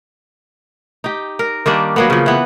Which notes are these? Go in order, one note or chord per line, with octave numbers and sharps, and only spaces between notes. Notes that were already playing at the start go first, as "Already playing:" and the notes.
D#4 G4
A#4
D#3 G3 A#3 D4
F#3 A#3 B3
C#3 F3
E3 B3